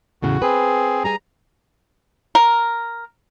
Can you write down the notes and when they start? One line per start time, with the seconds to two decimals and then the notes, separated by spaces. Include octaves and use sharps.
0.22 E2 A2 C#3 F#4
0.42 C4 G#4 B4
1.04 G3 G#4 G#5 A#5
2.35 A#4